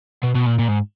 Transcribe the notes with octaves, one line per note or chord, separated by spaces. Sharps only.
B2
B2
A#2
A#2
G#2